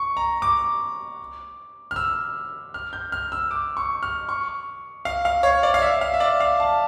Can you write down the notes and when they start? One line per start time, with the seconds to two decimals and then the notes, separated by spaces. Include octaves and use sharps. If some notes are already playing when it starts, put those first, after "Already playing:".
Already playing: C#6
0.17 A#5
0.42 D6
1.91 F6
1.96 E6
2.74 F6
2.93 G6
3.12 F6
3.32 E6
3.51 D6
3.77 C#6
4.03 F6
4.29 C#6
5.05 F5
5.25 F5
5.43 C#5
5.63 D5
5.74 F5
5.82 E5
6.01 F5
6.14 E5
6.20 D5
6.40 F5
6.60 A5